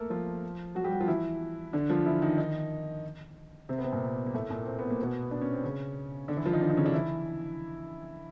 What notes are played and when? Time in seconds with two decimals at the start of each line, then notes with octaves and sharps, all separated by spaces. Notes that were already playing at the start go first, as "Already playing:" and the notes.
Already playing: A3 A#3 A4 A#4
0.10 F3 F4
0.75 F#3 F#4
0.84 G3 G4
0.92 F#3 F#4
1.00 F3 F4
1.08 E3 E4
1.73 D3 D4
1.90 F3 F4
2.06 E3 E4
2.22 D#3 D#4
2.38 D#3 D#4
3.69 C3 C4
3.78 B3
3.84 C3 C4
3.92 A#2 A#3
4.27 A#3
4.34 A2 A3
4.49 A#2 A#3
4.66 C4
4.79 B3
4.90 A#3
5.03 B2 B3
5.31 D4
5.41 C#4
5.53 C4
5.63 C#3 C#4
6.28 D3 D4
6.37 E3 E4
6.45 F3 F4
6.53 D#3 D#4
6.61 D3 D4
6.69 D#3 D#4
6.77 C#3 C#4
6.86 D3 D4
6.93 E3 E4